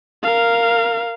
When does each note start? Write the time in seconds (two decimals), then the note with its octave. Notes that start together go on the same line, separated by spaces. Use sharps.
0.23 A#4 F5